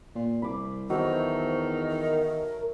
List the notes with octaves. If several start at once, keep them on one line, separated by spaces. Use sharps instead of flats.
A#2
C2 B5 D6
E2 D#3 F#3 A3 C5
A#4